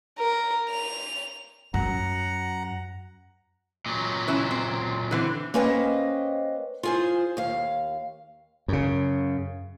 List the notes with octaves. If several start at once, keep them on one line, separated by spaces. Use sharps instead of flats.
A#4
F7
F#2 F#5 A#5
A#2 F#3
E3 C#4 E4
C4
D3 E3 C4
A#3 C#4 B4 C5 D#5 G5
F4 G#4 C5
D#2 F5
F#2 C#3